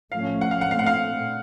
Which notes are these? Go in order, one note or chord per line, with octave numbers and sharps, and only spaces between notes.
A2 F3 A3 C#4 F5
F#5
F5
F#5
A#2 A3 C4 F5
F#5
F5